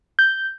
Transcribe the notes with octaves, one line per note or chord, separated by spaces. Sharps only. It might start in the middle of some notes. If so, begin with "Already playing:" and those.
G6